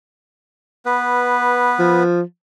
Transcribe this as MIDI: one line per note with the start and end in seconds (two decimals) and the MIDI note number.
0.85 2.03 59
0.85 2.03 71
1.79 2.22 53